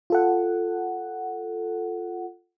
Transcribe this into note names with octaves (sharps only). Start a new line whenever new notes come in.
F4 A4 F#5